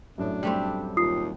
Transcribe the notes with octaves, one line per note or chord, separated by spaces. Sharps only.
F#2 A2 F#3 D4
G3 A3 C4
D#2 F4 D#6 C7